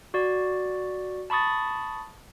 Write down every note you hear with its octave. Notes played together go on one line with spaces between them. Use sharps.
F#4 D5
A5 B5 C#6 D#6 A6